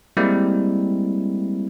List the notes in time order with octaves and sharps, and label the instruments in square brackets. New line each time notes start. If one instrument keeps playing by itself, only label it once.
[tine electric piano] G3 G#3 A#3 C4 E4